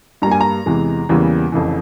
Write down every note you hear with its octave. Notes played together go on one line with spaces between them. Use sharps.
G2 G3 A#3 A#5
G#5
A#5
E2 C3 E3 G#3
E2 C#3 E3 G3 A#3
F1 F2 C#3 E3